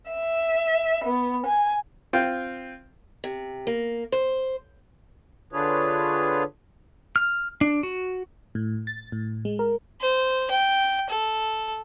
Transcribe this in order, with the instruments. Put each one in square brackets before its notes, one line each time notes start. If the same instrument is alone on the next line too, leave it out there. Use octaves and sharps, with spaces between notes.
[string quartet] E5
B3
G#5
[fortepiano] C4 F4 G5
[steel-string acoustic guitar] C3
A#3
C5
[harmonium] D3 D4 F4 G#4 B4 C#5
[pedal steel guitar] F6
D4
F#4
[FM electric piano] A2
A6
A2
G#3
A#4
[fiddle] C5
G5
A4